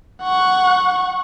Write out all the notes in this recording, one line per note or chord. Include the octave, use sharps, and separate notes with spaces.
F#5 C#6